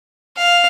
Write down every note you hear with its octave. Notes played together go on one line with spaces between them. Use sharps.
F5